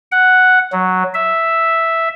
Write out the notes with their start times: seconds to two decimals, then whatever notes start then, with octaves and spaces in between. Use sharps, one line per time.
0.12 F#5
0.72 F#3
1.14 E5